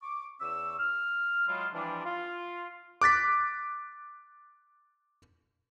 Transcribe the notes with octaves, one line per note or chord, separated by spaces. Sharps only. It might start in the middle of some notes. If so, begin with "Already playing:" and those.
C#6 D6
E2 C#4 C#6 D6 E6
F6
F#3 G#3 E4 F4
E3 F3 G3 D4
F4
D6 F#6 A6 B6